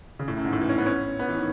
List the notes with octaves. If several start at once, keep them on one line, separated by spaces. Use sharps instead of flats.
C#3
A2
F#2
G#2
A2
E3
C#4
B3
C#4
B3
E3
D#3